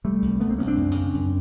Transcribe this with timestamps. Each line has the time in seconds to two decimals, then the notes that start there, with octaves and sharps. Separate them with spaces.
0.04 C3 G3 A3
0.22 C2
0.40 C2 A3 B3
0.49 A#3 C4
0.58 C2 B3 C#4
0.67 C4 D4
0.76 F#2
0.95 C#3
1.14 F#2